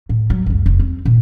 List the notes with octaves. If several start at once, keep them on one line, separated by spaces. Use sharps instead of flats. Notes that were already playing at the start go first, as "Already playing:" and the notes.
A2
F#3
F#1 C#2
F1
C4
A#2